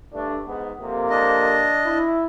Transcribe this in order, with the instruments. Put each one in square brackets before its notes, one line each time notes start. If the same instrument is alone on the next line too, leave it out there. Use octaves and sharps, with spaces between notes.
[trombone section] G2 A3 D4
G#2 B3
F2 C3 A#3
[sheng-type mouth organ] D4 D#5
[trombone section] E4